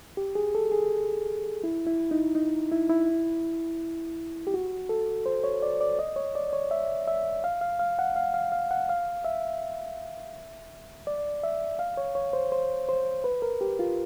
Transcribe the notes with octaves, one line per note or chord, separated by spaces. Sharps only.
G4
G#4
A4
G#4
E4
E4
D#4
D#4
E4
E4
G4
F#4
A4
C5
C#5
D5
D5
D#5
C#5
D5
C#5
E5
E5
F5
F5
F5
F#5
F5
F5
F5
F#5
F5
E5
D5
E5
F5
C#5
C#5
C5
C5
C5
B4
A#4
G4
F4